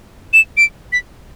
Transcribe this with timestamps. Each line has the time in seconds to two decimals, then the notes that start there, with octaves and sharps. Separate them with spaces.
0.33 E7
0.57 D7
0.93 B6